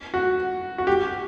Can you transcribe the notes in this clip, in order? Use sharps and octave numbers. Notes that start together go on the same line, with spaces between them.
F#4
F#4
G4